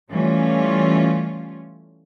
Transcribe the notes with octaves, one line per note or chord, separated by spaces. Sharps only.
E3 G3 A3 C#4 F4